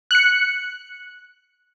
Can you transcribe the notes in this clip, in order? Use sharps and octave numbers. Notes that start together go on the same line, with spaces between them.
F#6 C#7